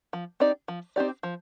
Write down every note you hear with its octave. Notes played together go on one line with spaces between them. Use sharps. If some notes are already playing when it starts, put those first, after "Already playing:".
F3
C4 D#4 G4 D5
F3
C4 D#4 G4 D5
F3